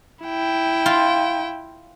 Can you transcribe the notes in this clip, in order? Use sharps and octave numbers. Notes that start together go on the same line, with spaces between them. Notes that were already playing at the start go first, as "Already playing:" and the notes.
E4 G5
F4